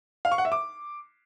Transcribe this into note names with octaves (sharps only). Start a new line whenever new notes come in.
F5
C#6
F#5
E5
D6